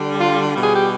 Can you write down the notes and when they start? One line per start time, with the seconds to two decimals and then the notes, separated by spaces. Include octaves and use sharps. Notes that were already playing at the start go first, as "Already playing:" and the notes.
Already playing: D3 G3
0.19 F4
0.54 B2 G3
0.62 G#4
0.76 G4